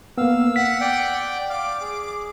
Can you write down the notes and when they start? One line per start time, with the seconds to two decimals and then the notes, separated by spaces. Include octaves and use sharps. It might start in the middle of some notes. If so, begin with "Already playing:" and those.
0.18 A#3 B3 F5 E6
0.56 F#5 B6
0.81 D5 G5
1.50 D5 F5 D6
1.81 G#4